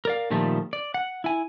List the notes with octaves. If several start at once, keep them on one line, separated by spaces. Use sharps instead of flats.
A#4 D5 F5
A#2 D#3 F3 G3 A3
D5
F#5
E4 G#5